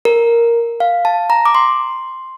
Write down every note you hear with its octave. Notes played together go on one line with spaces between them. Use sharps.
A#4
F5
A5
A#5
D6
C6